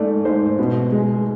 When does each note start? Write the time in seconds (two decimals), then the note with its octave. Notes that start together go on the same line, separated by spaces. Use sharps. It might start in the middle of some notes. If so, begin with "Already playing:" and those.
Already playing: G#2 A3 D5
0.25 G#2 C5
0.59 B2
0.92 G#3